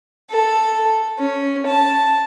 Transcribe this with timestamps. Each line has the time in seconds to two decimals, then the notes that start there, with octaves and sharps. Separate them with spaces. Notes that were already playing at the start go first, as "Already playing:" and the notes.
0.30 A4
1.19 C#4
1.66 A5